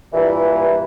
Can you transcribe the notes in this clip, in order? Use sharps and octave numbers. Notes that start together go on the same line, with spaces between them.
G2 A#2 E3